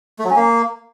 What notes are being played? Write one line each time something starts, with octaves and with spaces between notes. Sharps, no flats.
A3
F#3
C#4
A#3